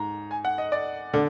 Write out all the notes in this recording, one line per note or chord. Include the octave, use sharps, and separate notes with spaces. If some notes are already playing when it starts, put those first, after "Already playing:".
Already playing: G#2 A#5
G#5
F#5
D#5
D5
D3